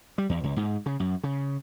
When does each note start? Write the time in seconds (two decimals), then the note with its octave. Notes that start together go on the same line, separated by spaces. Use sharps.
0.18 G3
0.29 E2
0.44 C#2
0.56 G#2
0.86 C#3
1.00 F#2
1.23 C#3